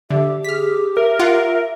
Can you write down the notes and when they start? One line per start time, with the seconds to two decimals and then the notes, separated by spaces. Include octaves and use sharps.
0.11 D3 G4 E5
0.44 G#4 F6 B6
0.97 A#4 E5
1.19 F4 F#5